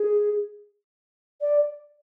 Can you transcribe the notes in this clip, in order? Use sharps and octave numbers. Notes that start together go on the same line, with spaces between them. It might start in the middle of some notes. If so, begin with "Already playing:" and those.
Already playing: G#4
D5